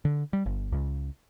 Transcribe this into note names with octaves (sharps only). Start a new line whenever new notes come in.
D3
G3
G1
C#2